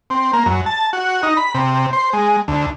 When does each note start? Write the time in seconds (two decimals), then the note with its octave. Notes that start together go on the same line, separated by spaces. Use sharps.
0.10 C4
0.33 A#3
0.46 F#2
0.66 A5
0.93 F#4
1.23 D#4
1.37 B5
1.55 C3
1.93 C5
2.13 G#3
2.48 D2